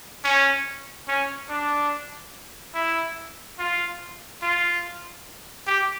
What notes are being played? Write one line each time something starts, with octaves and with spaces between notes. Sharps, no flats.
C#4
C#4
D4
E4
F4
F4
G4